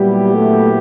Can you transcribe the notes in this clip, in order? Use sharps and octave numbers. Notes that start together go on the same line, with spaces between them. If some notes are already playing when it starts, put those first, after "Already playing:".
Already playing: A#2 F#3 G3 B3 E4 G4
A3